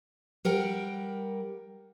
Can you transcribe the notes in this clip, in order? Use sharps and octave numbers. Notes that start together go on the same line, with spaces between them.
G3 A#4 F#5 G5